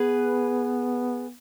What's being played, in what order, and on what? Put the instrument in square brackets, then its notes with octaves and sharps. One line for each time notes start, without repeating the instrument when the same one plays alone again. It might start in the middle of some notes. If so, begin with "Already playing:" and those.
Already playing: [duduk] B3 [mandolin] G#4 B4